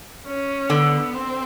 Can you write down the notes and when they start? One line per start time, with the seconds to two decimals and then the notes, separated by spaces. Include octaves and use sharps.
0.26 C#4
0.70 D3 B3
1.14 C4